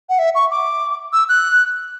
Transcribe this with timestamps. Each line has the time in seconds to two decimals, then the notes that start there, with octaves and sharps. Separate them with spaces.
0.09 F#5
0.19 E5
0.35 C#6
0.51 D6
1.13 E6
1.29 F#6